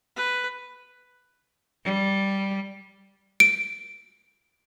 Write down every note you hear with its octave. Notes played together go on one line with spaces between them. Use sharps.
B4
G3
D7